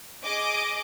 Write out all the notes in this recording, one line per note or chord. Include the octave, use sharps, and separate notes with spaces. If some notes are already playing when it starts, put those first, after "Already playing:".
G#4 D#5 D6